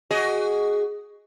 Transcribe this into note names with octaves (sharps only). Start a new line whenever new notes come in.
F#4 G#4 D#5